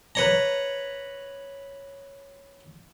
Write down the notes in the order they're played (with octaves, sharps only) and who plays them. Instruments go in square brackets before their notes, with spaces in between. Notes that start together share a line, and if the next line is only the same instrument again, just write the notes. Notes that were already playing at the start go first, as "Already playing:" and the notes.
[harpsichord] B4 C#5 A#5